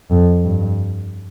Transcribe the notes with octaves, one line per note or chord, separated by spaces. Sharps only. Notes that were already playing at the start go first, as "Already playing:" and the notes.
F2
G2